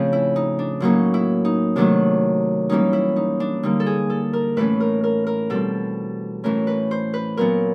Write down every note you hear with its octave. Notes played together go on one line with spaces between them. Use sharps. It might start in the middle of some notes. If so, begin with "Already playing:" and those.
Already playing: A2 C#3 F3 A3 C4
E4
D#4
D4
A2 F#3 A#3 C#4 D#4
E4
D#4
C3 D#3 F#3 A3 D4
E3 G3 A#3 C#4 D#4
E4
D#4
D4
D3 G3 A#3 D#4
A4
G#4
A4
A#4
A2 E3 A3 C#4 B4
A#4
A#4
A#4
B2 G3 C4 A4
A2 E3 A3 C#4 A#4
B4
C5
B4
A#2 F#3 B3 A#4